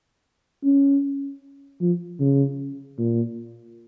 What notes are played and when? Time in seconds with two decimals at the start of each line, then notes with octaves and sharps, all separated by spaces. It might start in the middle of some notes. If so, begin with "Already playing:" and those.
0.64 C#4
1.81 F3
2.20 C#3
2.98 A#2